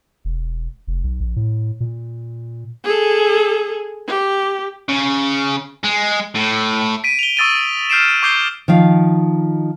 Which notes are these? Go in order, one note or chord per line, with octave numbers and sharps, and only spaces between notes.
E1
F1
B1
A#1
A2
A#2
G#4 A4
G4
C#3
G#3
A2
B6 D7 D#7
F7 G7
C#6 D#6 E6 A6 D7 D#7
F6 G6 C7 D7 E7
C#6 D6 G6 C7 G7
D#3 F3 F5